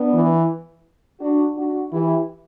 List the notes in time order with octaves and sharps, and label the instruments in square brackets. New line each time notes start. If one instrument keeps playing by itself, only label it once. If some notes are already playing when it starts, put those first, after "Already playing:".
Already playing: [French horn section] B3 D4
[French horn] E3
[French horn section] D4 F#4
D4 F#4
[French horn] E3 [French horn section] E4 G4